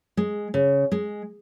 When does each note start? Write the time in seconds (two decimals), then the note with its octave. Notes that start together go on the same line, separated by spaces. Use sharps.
0.17 G#3
0.54 C#3
0.92 G#3